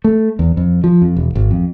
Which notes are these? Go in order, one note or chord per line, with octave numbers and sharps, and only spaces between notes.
A3
E2
F2
F3
F2
E1
G#1
F2